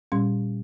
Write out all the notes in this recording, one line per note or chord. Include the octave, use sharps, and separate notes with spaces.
A#2 G3 C#4 C6